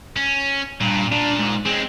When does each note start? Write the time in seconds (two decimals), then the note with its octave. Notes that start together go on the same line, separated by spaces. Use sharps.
0.17 C#4
0.81 G2 A#2
1.12 A#2 D4
1.39 G#2
1.65 G#3 C4 C#4